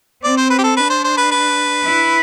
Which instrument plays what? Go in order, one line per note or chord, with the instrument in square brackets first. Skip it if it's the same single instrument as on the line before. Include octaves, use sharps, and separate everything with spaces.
[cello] C4 [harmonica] D5
[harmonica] C5
B4
G4
A4
[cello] D4 [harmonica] B4
[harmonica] C5
C5
B4
B4
[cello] E4